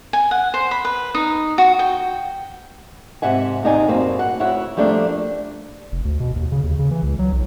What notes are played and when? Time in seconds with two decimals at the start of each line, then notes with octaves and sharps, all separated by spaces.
0.13 G#5
0.31 F#5
0.54 C5
0.71 B5
0.85 B4
1.15 D#4
1.58 F#4
1.79 G5
3.22 G#2 C3 E5 F#5 G#5
3.63 D#2 C3 D#4 D5 G#5
3.88 F#2 B2 A#3 C4
4.19 F#5
4.40 D2 E4 C#5 F#5
4.77 F3 G3 A3 A#3 D4
5.92 F1
6.05 D2
6.20 B2
6.36 D#2
6.52 C#3
6.63 D#2
6.79 C#3
6.91 E3
7.03 C#2
7.19 F#3
7.32 B1